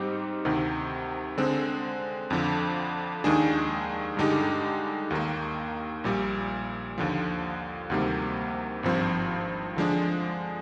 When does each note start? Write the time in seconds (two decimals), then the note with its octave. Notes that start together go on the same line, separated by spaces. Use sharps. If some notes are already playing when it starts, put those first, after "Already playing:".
Already playing: G#2 G3 C4 D#4 G4
0.45 D2 C3 D#3
1.38 D3 G#3 C4
2.30 F2 D3 F3
3.24 D#2 D#3 G#3 D4 G#4
4.17 G2 D3 G#3 D#4 G4
5.10 D#2 D#3 A#3
6.04 A#1 A#2 G3
6.98 D#2 D3 F3
7.90 D2 C3 D#3 G3 A#3
8.83 G#1 G2 F3 C4
9.76 D3 F3 G#3 D4